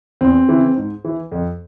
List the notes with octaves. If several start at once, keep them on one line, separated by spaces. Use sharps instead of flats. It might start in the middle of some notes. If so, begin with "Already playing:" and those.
E2 C4
C#3 E3
G#2
E3
F2